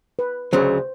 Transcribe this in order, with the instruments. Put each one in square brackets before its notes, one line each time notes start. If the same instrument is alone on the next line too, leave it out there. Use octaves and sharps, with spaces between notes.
[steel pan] B4
[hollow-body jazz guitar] D2 C#3 F#3 [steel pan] C5